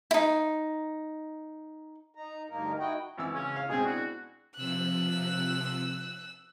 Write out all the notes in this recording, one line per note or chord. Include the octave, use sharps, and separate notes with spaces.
D#4 E4
D#4 A#5
D2 G2 A#3 D#4 A#4
D#4 E4 F#4 D#5 G5
G#1 E3 E6
C#3 C#4
C#5 F5
B2 G#3 C4 G#4
D4 E4 F#4
C3 F3 E6 F#6